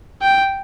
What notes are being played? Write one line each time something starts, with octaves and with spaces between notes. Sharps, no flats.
G5